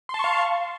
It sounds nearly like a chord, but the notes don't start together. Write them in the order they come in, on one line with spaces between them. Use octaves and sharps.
C6 A5 C#6 F5